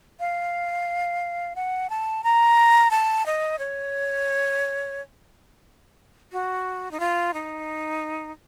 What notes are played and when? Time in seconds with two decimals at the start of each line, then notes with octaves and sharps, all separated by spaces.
0.20 F5
1.56 F#5
1.90 A5
2.24 A#5
2.91 A5
3.26 D#5
3.59 C#5
6.32 F#4
6.91 D#4
7.00 F4
7.34 D#4